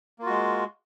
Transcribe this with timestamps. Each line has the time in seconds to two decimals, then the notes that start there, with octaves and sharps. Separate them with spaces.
0.19 A#3
0.22 F4
0.26 F#4
0.30 G#3